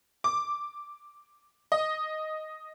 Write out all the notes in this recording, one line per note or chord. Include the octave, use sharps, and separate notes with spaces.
D6
D#5